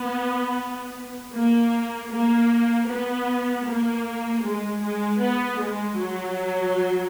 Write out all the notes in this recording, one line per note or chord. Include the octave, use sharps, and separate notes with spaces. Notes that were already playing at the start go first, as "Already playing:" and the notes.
Already playing: B3
A#3
A#3
B3
A#3
G#3
G#3
B3
G#3
F#3